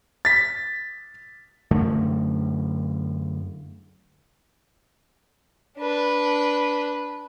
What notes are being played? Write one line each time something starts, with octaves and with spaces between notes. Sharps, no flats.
A6 B6
F#2 D3 A3
D4 B4